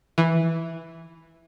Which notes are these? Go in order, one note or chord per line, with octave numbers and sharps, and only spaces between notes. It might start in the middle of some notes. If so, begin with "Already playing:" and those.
E3